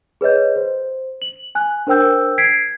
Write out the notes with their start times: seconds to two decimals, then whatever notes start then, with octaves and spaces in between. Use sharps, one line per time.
0.21 G#4 B4 C#5 D#5 G6
0.56 C5
1.22 F#7
1.55 G#5 F#6
1.87 D4 A#4 C5 G5 E6 G6
2.38 G#6 B6 C7 D7